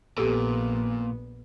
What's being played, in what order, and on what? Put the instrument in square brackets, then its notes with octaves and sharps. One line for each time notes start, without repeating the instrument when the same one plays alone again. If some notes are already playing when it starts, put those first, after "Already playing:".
[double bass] A#1 B3 [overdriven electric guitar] A#2 [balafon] G4 A4